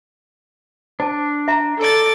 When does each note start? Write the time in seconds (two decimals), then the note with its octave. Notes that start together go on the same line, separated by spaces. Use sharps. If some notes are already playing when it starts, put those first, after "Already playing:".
1.00 D4 C5 A5
1.48 E5 A#5
1.78 A4 D5 A6